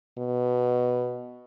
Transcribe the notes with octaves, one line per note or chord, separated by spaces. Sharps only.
B2